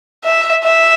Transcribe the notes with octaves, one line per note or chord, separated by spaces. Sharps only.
E5
E5